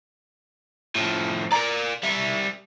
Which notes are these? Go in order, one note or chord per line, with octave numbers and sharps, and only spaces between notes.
A2 F3
A#4 D5 A#5
G3 E5